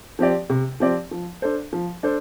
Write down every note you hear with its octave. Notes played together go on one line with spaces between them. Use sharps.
F3 C4 G4 D5
C3
F3 C4 G4 D5
F3
D4 A4 C5
F3
D4 A4 C5